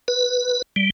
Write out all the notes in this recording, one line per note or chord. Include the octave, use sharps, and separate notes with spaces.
B4
G3